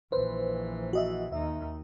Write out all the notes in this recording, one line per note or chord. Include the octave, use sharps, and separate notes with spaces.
A#1 E3 B4 C5
F#4 D#5 E5
D#2 D#4 E5